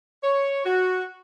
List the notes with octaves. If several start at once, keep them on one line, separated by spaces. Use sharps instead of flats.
C#5
F#4